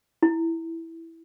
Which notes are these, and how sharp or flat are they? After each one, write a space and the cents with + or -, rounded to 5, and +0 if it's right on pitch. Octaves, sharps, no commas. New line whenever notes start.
E4 +0